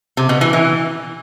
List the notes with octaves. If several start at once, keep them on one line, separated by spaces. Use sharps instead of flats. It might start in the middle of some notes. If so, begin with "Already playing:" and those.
C3
B2
E3
E3